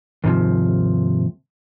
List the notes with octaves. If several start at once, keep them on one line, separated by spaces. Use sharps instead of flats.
D#2 G#2 C3 F3